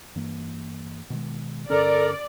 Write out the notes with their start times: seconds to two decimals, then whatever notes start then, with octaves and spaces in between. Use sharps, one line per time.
0.15 G2 E3 A#3
1.10 B2 D#3 G#3
1.70 G2 D3 C#4 A4 A#4 D5